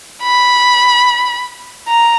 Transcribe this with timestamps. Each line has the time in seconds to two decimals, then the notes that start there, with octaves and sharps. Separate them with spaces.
0.23 B5
1.89 A#5